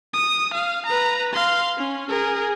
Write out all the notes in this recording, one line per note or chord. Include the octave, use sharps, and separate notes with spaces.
D#6
F5
B4 A#5
F5 C6
C#4
G#4 A#4